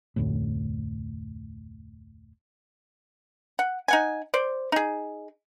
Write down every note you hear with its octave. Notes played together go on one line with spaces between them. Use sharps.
F1 D2 A2
F#5
D#4 F#5 G#5
C5 D5
D#4 G#4